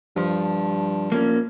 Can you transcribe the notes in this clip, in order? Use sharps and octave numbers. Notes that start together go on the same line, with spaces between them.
G2 F3
A#2 A#3 C#4